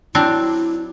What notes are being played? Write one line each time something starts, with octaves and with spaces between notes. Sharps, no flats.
F#3 C4 D4 E4